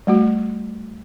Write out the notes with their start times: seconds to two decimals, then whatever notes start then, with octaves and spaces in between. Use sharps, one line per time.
0.07 G3 A3 F#4